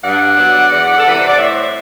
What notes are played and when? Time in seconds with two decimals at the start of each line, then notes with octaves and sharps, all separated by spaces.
0.03 G2 D5 F#5
0.36 F#3 B3 D4
0.71 E2
0.97 A4
1.04 C3 E3 G3 B4
1.17 C5
1.27 D5
1.37 A2 C5 E5